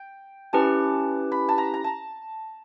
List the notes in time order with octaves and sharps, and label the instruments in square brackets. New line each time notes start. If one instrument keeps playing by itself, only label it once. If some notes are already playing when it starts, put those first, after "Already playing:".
Already playing: [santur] G5
[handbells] C#4 E4 G4 B4 [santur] A5
[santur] B5
A5
A#5
A#5
A5